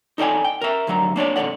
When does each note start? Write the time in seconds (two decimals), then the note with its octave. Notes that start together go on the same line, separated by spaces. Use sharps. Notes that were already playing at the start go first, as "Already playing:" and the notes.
0.18 D#4 A4 D5 G5 G#5
0.45 G5
0.61 A#4 E5
0.87 D2 G2 F#3 A#5
1.16 A#3 D4 C#5 D5
1.36 C2 G#2 F3 A4 D5 F#5